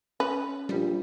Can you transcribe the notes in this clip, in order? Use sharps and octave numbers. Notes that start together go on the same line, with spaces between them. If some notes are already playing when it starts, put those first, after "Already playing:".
C#4 B4
A#1 G3